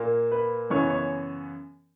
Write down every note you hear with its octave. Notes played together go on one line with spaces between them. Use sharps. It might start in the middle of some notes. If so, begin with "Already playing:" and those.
Already playing: A#2 A#3
B4
F#2 C#3 E3 B3 C#5
C#5